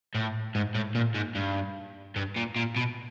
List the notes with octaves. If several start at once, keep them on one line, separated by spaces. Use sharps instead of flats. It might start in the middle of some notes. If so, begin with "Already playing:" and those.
A2
G#2
A2
A#2
G#2
G2
G2
A#2
A#2
B2